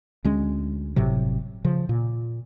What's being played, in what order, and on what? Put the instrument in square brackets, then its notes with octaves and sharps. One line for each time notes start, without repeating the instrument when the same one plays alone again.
[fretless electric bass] D2 G#3 C#4
G1 A2 C3 F#3
C#3 F3
A#2